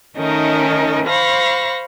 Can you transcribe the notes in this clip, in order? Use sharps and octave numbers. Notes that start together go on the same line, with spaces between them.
D#3 A3 C#4 D#4 A#4 D#5
C5 F5 B5 C#6 A#6